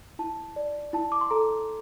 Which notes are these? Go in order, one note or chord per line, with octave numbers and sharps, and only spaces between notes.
E4 A5
D5
E4 A5
D6
C6
A4 A#5